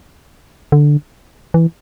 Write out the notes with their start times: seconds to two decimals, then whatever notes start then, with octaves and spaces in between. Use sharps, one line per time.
0.72 D3
1.54 E3